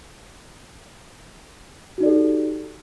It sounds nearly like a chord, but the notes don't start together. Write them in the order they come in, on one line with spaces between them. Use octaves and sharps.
F#4 D#4 D5 A4 G4